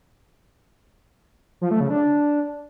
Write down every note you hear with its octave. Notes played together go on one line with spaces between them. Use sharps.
F3
A3
C#3
D4